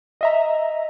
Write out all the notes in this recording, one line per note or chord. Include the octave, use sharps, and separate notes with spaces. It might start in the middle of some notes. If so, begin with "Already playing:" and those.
D#5 E5 A#5